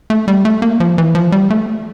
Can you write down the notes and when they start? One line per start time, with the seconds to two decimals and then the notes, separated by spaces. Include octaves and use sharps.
0.10 A3
0.28 G3
0.45 A3
0.62 A#3
0.80 F3
0.98 E3
1.15 F3
1.32 G3
1.50 A3